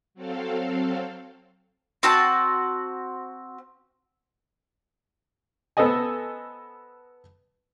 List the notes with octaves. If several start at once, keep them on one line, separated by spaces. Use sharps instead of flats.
F#3 C4 A4 F5
C4 F#4 A5
B3 A4 C5 D#5 G#5